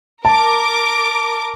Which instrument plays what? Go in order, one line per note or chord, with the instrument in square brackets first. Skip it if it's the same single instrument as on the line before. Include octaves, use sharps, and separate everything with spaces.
[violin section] A#4 D6 [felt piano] A5